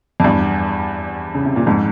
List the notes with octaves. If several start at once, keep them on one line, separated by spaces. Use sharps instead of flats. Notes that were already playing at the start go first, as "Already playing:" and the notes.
F2
E2 G2
C#3
C3
A#2
F2 G#2